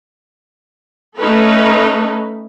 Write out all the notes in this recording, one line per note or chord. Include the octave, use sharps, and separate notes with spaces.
A3 C#4 D#4 A4 B4